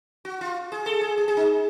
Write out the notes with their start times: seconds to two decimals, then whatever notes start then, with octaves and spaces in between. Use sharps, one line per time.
0.25 F#4
0.41 F4
0.72 G#4
0.86 A4
1.01 G#4
1.18 G#4
1.28 G#4
1.37 D#4